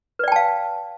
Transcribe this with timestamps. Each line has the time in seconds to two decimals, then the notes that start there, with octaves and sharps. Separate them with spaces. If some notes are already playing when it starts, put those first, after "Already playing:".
0.19 B4
0.24 D5
0.28 G5
0.32 A5
0.36 F5